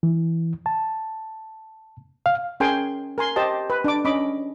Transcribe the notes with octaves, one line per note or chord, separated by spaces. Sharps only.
E3
A5
F5
C#4 G#4 A#4 G5 G#5 C6
A#4 G#5 C6
G4 C5 D#5 A5
B4
D4 D6
C#4 D#5 B5 D6